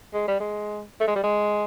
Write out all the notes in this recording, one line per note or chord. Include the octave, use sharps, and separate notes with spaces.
G#3
G3
G#3
A3
G#3
G3
G#3